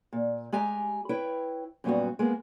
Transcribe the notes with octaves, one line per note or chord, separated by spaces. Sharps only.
A#2
G#3 G4 G#5 A#5
E4 B4 C#5 G5
F#2 A#2 G3 B3 F#4
G#3 A#3 B3